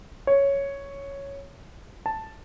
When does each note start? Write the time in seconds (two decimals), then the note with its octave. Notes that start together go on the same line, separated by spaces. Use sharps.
0.27 C#5
2.06 A5